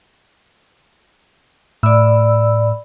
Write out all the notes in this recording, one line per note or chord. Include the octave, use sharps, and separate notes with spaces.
A2 D5 B5 E6